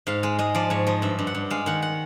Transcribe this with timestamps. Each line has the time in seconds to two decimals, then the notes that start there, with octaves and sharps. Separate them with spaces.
0.07 G#2 F5
0.23 G#3
0.39 G#3 D#5
0.55 F3 D5
0.70 G#2 C#5
0.87 F3 D#5
1.02 G2 E5
1.19 G2
1.27 F#5
1.35 G2
1.50 G#3 F5
1.66 D#3 F#5
1.82 F#5